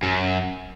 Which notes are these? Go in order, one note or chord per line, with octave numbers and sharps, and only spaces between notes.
F#2